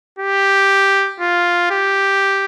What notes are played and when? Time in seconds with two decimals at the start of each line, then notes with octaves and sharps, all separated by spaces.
0.19 G4
1.20 F4
1.71 G4